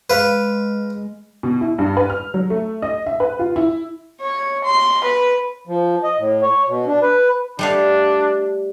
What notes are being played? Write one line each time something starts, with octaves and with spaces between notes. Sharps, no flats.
G#3 B4 F5
B2
E4
G2
B4
F6
F#3
A3
D#5
E5
B4
F4
E4
C#5
C6
B4
F3
D#5
A2
C#5
B2
D4
B4
G3 A3 D4 F5